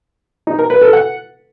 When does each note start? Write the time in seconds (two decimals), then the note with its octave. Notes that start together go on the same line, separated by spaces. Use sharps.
0.47 D#4
0.58 A#4
0.70 B4
0.81 A4
0.93 F#5